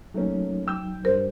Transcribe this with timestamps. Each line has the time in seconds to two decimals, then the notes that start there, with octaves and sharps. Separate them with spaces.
0.14 F#3 A3 A#3 C#4 D#4
0.67 G5 E6 G6
1.05 G2 G3 A#4 C5